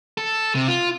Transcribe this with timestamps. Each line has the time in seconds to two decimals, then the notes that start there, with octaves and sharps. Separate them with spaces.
0.17 A4
0.55 C3
0.68 F4